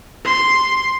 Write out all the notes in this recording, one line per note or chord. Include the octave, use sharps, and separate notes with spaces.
C6